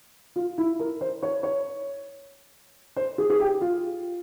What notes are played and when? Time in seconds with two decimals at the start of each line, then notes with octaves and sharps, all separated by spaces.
0.36 F4
0.58 E4
0.79 A#4
1.01 C5
1.23 C#5
1.43 C#5
2.96 C5
3.18 G#4
3.30 G#4
3.40 G4
3.61 F4